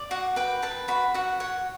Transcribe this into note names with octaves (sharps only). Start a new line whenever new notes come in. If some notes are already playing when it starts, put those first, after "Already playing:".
Already playing: D5
F#4 F#5
B4 G5
B4 A5
F#4 B5
F#4 F#5
C#5 F#5